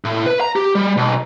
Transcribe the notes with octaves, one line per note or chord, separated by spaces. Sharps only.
A2
B4
A#5
G4
G3
B1